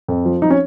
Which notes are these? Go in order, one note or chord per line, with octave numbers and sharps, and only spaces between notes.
F2
F3
F3 D#4
C#4